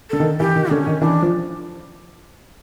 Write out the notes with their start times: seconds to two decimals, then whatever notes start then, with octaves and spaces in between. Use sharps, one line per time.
0.10 D3 A4
0.20 D#3
0.40 E3 G4
0.56 D#3
0.71 D3 C#4
0.87 D#3
1.01 E3 D4
1.22 F3